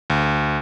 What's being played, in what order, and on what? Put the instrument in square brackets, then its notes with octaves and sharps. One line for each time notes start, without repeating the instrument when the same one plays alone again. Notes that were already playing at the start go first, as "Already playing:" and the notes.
[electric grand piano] D2